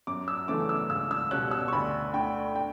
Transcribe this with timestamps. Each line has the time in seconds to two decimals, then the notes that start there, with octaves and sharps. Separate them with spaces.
0.07 F#2 D6
0.28 E6
0.48 C#3 E3 A3 D4 D6
0.69 E6
0.90 C#2 E6
1.11 E6
1.31 B2 G3 C#4 F#6
1.51 E6
1.68 C#6
1.73 D2 B5
2.13 D3 A3 G5
2.56 G5